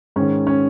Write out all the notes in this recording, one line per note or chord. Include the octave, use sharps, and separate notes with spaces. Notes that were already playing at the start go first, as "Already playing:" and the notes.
G#2 D#3 C#4
C#4